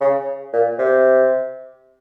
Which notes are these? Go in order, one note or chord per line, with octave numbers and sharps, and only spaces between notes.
C#3
A#2
C3